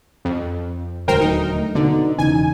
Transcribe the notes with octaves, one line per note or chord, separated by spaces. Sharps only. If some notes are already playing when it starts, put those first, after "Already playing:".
F2
D#1 D2 F#3 A#4 C5 G5
A3 D#4
B2 D3 D#4
E1 C#3 E3 D#4 G#5